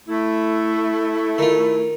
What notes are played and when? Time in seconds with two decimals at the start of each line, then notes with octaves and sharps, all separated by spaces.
0.08 A3 E4
1.38 D#3 F4